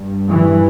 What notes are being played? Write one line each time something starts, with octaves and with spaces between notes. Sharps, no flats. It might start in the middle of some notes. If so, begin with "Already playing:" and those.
Already playing: G2
E3